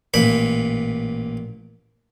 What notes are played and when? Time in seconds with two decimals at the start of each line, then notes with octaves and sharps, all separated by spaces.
0.14 A1 A#2 B5